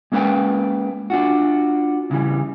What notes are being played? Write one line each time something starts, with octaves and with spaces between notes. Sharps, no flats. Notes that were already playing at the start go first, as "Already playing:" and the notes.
G#3 A#3 C#4 B4 F5 G5
D4 F4 F#4
C#3 E3 G3